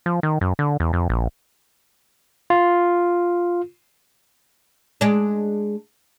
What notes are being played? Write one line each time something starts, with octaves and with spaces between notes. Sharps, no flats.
F3
D#3
F#2
D3
E2
F2
A#1
F4
G#3 D4